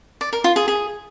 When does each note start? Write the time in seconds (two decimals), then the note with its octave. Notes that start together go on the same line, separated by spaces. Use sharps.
0.21 D5
0.33 A#4
0.44 F4
0.56 G#4
0.68 G#4